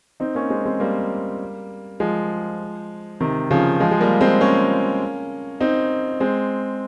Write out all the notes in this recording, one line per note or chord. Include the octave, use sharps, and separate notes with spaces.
C4 D#4
A#3 C#4
G#3 C4
G#3 C4
G3 A#3
F3 G#3
C3 D#3
C#3 F3
F3 G#3
G#3
G3 A#3
G#3 C4
A#3 C#4
C4 D#4
G#3 C4